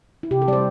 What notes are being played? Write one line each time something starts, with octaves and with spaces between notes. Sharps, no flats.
E4
C3 G4
A4
G3 D5
C5